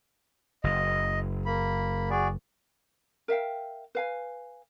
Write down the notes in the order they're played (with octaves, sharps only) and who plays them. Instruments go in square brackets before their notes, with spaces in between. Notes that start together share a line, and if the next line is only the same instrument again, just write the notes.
[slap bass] F#1 [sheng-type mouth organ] D#5
[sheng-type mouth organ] A#3 B5
F#4 G#4 D5
[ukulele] A#4 E5 F5 G5
B4 F5 G#5